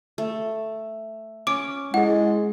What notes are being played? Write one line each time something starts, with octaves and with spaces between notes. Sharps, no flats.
A3
C#4 D6 D7
G#3 E4 G#4 F#5